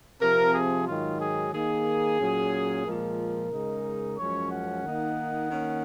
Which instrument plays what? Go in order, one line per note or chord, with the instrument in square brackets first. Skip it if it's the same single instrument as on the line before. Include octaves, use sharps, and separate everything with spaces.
[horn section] C3 F3 C4 A#4
G#4
G#2 D#3 F#3 F4
G#4
D#3 A#3 D#4 G#4
A#2 F#3 C#4
A#2 F3 G#3 A#4
C#3 G#3 D#4
F#2 F3 G#3 C#4 C#5
F#5
D#3 A#3 D#4
D#3 A#3 C#4